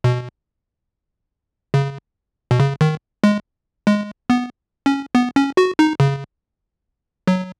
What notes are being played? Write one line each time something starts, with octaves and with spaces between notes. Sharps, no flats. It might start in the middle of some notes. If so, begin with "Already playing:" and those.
B2
C#3
B2
C#3
D#3
G#3
G#3
B3
C#4
B3
C#4
F#4
D#4
C#3
F#3